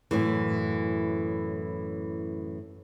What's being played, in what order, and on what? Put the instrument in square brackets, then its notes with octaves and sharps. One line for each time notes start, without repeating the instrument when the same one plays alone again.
[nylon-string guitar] F#2 A2 E3